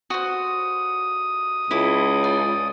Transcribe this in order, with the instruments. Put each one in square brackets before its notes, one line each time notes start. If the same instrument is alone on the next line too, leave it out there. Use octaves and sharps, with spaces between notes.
[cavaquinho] F#4 C5 [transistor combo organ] D#6
[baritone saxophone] C#2 [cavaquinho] E4 D6
[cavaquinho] D5